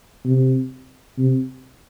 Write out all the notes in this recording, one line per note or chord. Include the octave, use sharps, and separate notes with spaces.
C3
C3